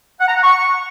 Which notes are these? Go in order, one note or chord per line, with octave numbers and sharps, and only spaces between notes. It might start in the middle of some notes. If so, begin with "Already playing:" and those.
F#5
A#5
F#5
C#6